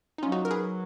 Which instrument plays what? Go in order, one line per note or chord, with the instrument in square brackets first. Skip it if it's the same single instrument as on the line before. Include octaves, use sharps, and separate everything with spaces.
[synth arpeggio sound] D#4
[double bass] F#3 [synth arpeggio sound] C#4 F4
[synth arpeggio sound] D#4 F#4
A#4
G#4 B4